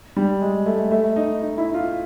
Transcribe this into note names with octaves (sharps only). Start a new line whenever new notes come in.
G3
G#3
A3
A3
D#4
D#4
E4
F4